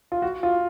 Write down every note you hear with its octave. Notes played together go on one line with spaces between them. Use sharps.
F4
F#4
F4